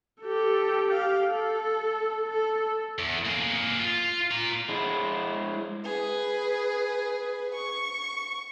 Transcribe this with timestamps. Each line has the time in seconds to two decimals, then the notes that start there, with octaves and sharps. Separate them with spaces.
0.22 G4 A4
0.89 G4 F5
1.28 A4
2.30 A4
2.99 E2
3.25 A#3 G#4
3.80 F4
4.31 F4 A#5
4.69 G#3 E4
5.84 G#4 B4
7.55 C#6